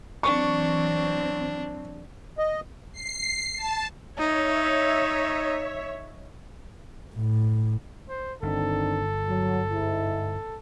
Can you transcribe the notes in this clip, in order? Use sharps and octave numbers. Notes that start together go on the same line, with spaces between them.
E3 F#3 C4 D4 C#6
D#5
C7
A5
D#4 C#5 E5
A2
C5
G1 D#3 C4 D4 A4
F#3
G#2 E4